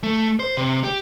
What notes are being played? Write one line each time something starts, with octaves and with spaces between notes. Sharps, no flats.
A3
C5
C3
G4